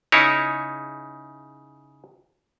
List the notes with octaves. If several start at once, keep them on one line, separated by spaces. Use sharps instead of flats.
C#3 D#4 E4 C#5